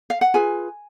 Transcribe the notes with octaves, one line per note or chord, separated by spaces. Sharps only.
F5
F#5
F4 G#4 B4 G#5